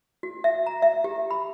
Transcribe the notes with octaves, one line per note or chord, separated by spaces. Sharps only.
F#4
E5
A#5
E5
G4
B5